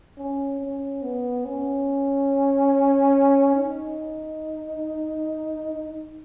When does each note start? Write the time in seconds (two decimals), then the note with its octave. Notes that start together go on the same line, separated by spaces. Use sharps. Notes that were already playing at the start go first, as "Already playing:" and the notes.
0.18 C#4
0.60 C#4
1.02 B3
1.45 C#4
3.56 D#4